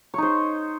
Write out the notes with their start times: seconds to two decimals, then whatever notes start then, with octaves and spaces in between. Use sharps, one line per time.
0.14 C#5
0.18 D#4
0.22 C5